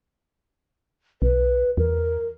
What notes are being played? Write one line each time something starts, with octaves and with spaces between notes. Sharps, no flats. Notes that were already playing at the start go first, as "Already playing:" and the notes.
B1 B4
E2 A#4